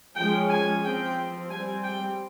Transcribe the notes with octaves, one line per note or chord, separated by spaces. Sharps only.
F3 G#3 C#4 G5
G#5
F3 C4 G5
G3 C4 G#5
G5